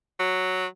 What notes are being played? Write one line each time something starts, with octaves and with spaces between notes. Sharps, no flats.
F#3